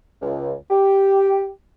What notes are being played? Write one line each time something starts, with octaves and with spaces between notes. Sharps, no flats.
C#2
G4